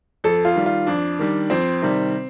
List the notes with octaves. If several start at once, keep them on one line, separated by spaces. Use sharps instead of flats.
F2 A4
F4
D#3 G3
F4
F2 D4
D#3 G3
F2 C4
C3 D#3 G3